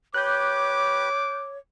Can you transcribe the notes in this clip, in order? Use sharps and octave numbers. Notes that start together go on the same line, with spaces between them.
G4 B4 C#5 D6 F#6 G6